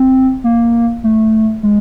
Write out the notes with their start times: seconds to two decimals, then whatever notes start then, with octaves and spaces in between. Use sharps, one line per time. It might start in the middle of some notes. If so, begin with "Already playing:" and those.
Already playing: C4
0.44 A#3
1.04 A3
1.63 G#3